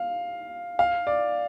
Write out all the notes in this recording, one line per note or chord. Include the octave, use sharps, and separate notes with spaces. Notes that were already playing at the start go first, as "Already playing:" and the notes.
Already playing: F5
F5
D5